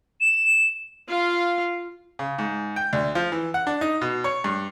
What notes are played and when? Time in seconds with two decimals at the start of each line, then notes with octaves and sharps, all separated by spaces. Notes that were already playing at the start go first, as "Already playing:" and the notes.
0.21 E7
1.08 F4 F5
2.19 C#3
2.38 G#2
2.76 G5
2.93 D2
3.15 F3
3.32 E3
3.54 F#5
3.67 D4
3.81 D#4
4.01 B2
4.24 C#5
4.44 G2